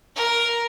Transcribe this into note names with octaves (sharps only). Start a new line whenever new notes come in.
A#4